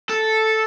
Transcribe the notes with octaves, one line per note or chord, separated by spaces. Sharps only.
A4